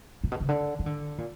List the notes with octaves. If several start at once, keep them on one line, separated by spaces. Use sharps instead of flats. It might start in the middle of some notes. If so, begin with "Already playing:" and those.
A#2
B2
C#3
D3
E3
D3
A#2